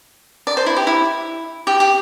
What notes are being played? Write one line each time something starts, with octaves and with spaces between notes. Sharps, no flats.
D5
C5
E4
G4
E4
G4
G4